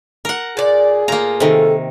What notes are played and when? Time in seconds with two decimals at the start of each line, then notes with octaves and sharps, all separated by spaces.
0.25 A#4 F#5
0.57 A#2 G#4 D5
1.08 A2 A#3 F4 A#5
1.40 C3 D#3 A4